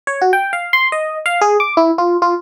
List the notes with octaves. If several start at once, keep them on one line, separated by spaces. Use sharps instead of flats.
C#5
F#4
G5
F5
C6
D#5
F5
G#4
D6
E4
F4
F4